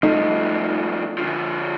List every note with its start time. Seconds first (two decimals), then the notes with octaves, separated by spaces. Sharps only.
0.03 G2 F3 A3 D#4
1.18 D3 F3